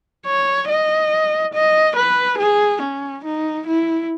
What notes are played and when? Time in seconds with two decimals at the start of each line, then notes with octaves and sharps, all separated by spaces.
0.26 C#5
0.69 D#5
1.54 D#5
1.97 B4
2.39 G#4
2.82 C#4
3.25 D#4
3.67 E4